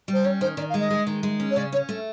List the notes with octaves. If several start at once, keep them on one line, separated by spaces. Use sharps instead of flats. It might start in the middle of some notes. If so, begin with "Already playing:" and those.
G3 C5
C#4 C#5
D#3 C5
D#3 D5
F5
G#3 D#5
G#3
D#3
G#3
C#4
C#5
C#3 D5
C#4 C#5
A3